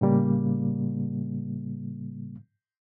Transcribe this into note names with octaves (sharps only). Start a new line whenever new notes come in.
A2 C#3 G3 A#3